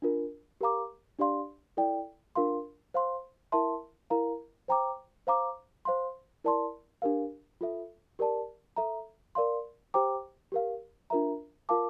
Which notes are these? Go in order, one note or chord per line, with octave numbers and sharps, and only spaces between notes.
D4 F4 A#4
G4 A#4 F5 A#5 D6
D4 G4 D5 F5 C6
E4 A4 D5 G5
D4 F4 A#4 F5 C6
C5 F5 C6
E4 A#4 E5 A5 C6
E4 A#4 F5 A#5
C5 G5 A#5 D6
C5 F5 A#5 D6
C5 F5 C6
E4 A#4 D5 A5 C6
D4 G4 A#4 F5
F4 A4 E5
G4 A#4 D5 A5
A4 E5 A#5
A#4 D5 F5 C6
G4 C5 G5 A#5 D6
G4 A#4 F5
D4 F4 A#4 E5 A#5
F4 A#4 F5 A5 D6